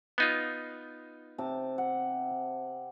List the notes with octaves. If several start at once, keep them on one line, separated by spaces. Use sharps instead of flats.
B3 D#4 F4
C3 A5
F#5